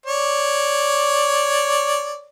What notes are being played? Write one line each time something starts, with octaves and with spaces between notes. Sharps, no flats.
C#5 D5